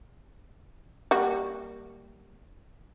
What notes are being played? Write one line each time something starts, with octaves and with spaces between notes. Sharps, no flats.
G3 A#3 F#4